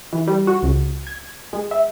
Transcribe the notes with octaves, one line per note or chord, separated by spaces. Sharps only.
E3
G3
F#4
C#2
G#6
G#3
E5